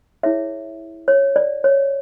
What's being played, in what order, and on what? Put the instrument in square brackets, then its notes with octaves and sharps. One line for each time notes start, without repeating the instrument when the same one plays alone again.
[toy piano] E4 G#4 C#5 E5
C#5
D5
C#5